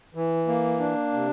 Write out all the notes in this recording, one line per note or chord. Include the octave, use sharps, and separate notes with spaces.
E3
A#3
D4
C3